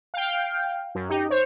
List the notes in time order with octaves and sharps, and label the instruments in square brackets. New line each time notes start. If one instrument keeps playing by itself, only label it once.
[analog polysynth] F5 G5
F#2
[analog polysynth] D#4 [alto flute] G4
[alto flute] C5 [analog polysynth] C#5